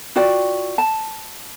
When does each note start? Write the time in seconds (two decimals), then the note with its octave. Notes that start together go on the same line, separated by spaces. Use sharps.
0.16 F4 F#4 D5 G5
0.78 A5